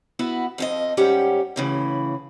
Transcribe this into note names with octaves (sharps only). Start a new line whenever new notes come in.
B3 E4 F#4 B4
F2 F3 D#5
G#2 G3 C#4 G4 C#5 F#5
A2 C#3 E3